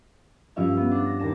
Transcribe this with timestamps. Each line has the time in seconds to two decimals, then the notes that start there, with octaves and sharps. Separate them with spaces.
0.56 G2 F3 C#4 E5 F6
0.77 B3
0.91 D4
1.06 A#6
1.19 D#2 A5 A#6 E7